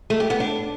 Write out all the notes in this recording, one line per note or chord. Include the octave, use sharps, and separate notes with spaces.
A3
G4
B3
D4